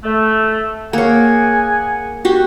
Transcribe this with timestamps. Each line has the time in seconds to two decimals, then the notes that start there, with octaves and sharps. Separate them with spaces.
0.04 A3
0.93 A#3 G#4 C#5 F#5 G#5
2.25 F#4 G4